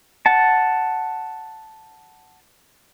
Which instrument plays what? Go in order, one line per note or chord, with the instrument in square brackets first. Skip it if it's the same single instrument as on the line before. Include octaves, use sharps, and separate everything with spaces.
[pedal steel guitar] F#5 A5